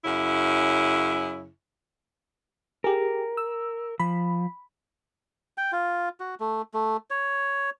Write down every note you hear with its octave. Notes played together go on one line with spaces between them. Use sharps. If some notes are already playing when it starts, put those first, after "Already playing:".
F#2 C#3 E4
G4 G#4 A#4
E6
F3 B5
G5
F4
F#4
A3
A3
C#5